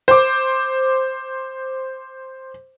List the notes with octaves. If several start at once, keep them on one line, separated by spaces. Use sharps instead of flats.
C5 D6